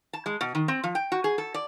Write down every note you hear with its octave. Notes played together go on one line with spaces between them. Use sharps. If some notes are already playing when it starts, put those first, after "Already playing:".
A5
G#3
B2
D#3
C4
F3
G5
F#4
G#4
A4
D5